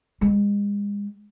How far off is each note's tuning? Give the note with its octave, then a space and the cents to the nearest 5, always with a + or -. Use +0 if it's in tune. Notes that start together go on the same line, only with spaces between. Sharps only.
G#3 -35